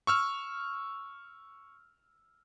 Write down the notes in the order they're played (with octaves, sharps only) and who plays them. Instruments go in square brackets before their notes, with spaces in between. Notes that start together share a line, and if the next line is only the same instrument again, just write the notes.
[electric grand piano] C#6 E6 F6